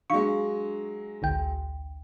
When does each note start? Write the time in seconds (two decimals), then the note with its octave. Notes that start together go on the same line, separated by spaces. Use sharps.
0.10 F#3 G#3 D4 F5 C#6 D6
1.22 A1 D2 G5